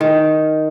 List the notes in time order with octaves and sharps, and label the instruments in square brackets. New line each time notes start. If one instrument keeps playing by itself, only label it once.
[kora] D#3